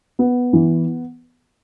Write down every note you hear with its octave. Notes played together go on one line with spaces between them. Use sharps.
B3
E3